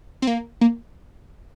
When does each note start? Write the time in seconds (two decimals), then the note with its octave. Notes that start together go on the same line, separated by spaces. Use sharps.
0.22 C4
0.27 A#3
0.61 A#3